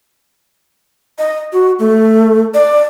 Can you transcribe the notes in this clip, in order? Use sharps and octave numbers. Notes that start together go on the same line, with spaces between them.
D#5
F#4
A3
D5